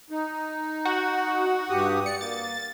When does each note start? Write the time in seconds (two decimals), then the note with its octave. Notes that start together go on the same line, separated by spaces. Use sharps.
0.10 D#4
0.85 F#4
1.70 G2 G4 D#6
2.06 D5 C#7
2.21 A#3 A6